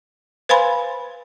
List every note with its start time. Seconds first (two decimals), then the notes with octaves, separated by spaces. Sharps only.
0.49 B4 C5 F5 G#5 B5 C6